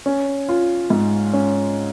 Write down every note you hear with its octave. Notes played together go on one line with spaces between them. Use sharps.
C#4
F4
G#2
C#4